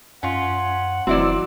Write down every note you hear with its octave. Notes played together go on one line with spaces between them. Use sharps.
F#2 C#4 F4 F#5
F1 E3 F#3 C4 E4 D5